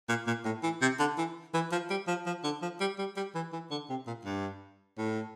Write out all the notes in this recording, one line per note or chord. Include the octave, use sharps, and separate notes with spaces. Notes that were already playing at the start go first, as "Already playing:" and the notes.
A#2
A#2
A2
E3
C3
D3
E3
E3
F3
G3
F3
F3
D3
F3
G3
G3
G3
E3
E3
D3
C3
A#2
G2
A2